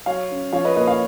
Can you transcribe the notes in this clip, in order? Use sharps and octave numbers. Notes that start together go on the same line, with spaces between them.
F#3 C#5 F5
C#4
F3 C#5 F5
B4 D#5
A#3 B4 D#5
C#5 F5